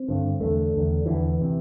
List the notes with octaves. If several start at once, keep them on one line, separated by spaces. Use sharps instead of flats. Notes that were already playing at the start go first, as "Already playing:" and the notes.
Already playing: C4
G2 D3
E2 D3 A3
E2 D3
E2 D3 E3
C3